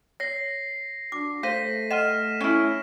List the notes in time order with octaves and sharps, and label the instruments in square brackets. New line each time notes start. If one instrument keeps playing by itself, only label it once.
[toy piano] C#5 [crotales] A#6 C7
[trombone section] D4 F#4 [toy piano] D6
[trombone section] A3 [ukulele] C5 [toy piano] F5 [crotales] A#6 B6 D#7
[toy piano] D#5 F#5 C6 [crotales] F6 D#7 E7
[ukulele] C#4 E4 [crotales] F6